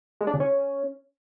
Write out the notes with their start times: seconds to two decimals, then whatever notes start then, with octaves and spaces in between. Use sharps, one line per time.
0.21 G#3
0.27 D4
0.34 C#3
0.40 C#4